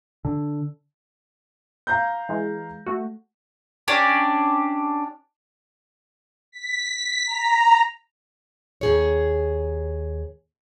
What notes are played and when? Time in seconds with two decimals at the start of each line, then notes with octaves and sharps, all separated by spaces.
0.25 D3
1.87 F5 A#5 G6
2.29 E3 G#3
2.86 A3 F#4
3.88 C#4 D4 G4 D5
6.51 B6
7.26 A#5
8.81 D#2 G#4 C#5